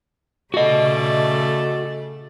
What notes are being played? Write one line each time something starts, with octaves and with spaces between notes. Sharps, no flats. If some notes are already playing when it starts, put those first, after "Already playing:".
C#3 A3 F#4 D5 D#5